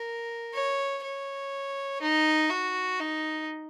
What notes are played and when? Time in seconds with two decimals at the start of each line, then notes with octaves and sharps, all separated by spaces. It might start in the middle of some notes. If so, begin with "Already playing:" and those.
Already playing: A#4
0.54 C#5
1.04 C#5
2.02 D#4
2.50 F#4
3.00 D#4